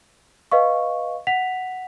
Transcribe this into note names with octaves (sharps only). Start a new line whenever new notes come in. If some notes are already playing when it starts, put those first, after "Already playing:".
B4 D#5 F5 C#6
F#5 B6 F7